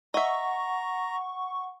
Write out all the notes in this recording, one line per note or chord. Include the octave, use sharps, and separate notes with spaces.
D#5 E5 F#5 A#5 C#6